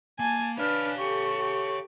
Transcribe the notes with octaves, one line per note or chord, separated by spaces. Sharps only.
A#3 G#5 A5
D4 B4 C#5 F5 F6
G4 A4 C#6
G4